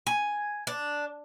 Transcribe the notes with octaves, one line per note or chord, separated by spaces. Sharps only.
G#5
D4